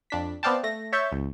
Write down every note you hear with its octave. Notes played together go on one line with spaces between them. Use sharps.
F2 D4 B6
B3 C4 D5 F5 G5 A5
A3 A#6
C#5 E5 C#6 G6 A6
C#2